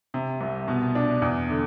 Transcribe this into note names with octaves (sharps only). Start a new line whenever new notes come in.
C3
C2
B2
D4
E2
D3